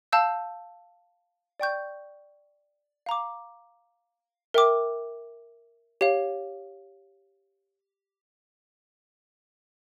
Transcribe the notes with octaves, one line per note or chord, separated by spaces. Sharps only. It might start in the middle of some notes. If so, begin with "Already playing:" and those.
F5 A5 E6 G6
D5 G5 C#6 G6
F5 A#5 D6
A#4 E5 G5 D6
G4 C#5 F5